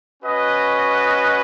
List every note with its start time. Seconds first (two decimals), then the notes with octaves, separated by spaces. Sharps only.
0.23 C#4 F#4 B4 D#5